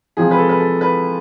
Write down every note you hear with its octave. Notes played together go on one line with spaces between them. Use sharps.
C3 F3 G#3 G#4
B4
A4
B4
A4
B4